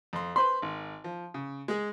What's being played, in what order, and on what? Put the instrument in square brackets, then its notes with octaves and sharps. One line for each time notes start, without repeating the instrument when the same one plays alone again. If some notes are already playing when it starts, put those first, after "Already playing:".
[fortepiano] F2 C6
[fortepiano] B4 C5 B5 [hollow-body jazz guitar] C6
[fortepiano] G#1
F3
C#3
G#3 G#4